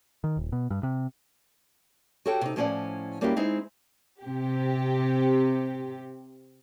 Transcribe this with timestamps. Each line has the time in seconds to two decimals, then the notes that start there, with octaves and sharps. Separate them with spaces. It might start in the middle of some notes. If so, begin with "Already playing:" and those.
0.24 D#3
0.37 D#1
0.52 B2
0.70 G2
0.83 C3
2.26 F#4 G4 A4 C#5 G5
2.41 C3 D#4
2.56 A2 F3 C#4 C#5 D5 F#5
3.21 G3 A#3 C#4 E4 F#4 G4
3.36 G#3 C4 D#4 E4
4.22 C3 G4